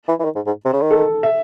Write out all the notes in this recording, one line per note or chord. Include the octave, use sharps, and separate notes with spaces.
E3
E3
D#3
G#2
G#2
C3
C#3
D#3
A4
E5